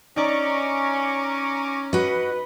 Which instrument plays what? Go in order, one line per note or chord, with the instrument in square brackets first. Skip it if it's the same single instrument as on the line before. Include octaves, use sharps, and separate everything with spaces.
[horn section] C#4 [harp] D#4 D5 [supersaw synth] A#5 C#6 D6
[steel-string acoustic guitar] F#4 D#5 [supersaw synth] B4